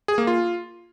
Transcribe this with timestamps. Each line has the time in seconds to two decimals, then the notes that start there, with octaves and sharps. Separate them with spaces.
0.08 G#4
0.18 A#3
0.27 F4